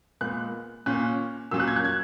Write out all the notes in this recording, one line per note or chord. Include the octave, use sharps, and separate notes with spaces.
A#2 G#3 B3 F#6
A#2 A#3 C#4 F#6
A#2 F#3 C#4 E6
F#6
G#6
F#6
G#6